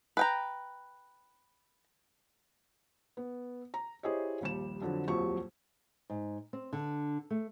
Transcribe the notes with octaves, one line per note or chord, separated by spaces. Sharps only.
B4 G5 A#5
B3
A#5
E4 G4 G#4 C5 C#5 D#5
A#1 D#2 G3 G4 E7
F2 D3 F#3 D4
D#1 A#1 F2 F#3 G4 C#6
G#2
C4
D3
A3